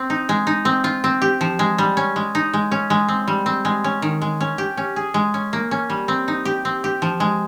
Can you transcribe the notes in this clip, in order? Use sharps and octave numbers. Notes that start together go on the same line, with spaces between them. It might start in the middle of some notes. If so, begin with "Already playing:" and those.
Already playing: C4
D#4
G#3
D#4
C4
F4
C4
G4
F3
G#3
G3
C#4
G#3
D#4
G#3
C#4
G#3
C4
G3
C4
G#3
C#4
D#3
G#3
C#4
G4
C#4
G#4
G#3
C#4
A#3
C#4
G3
C4
D#4
G4
C4
G4
F3
G#3